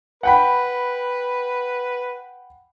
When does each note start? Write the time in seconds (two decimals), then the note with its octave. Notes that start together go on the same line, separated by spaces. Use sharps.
0.23 B4 F#5 G5 B5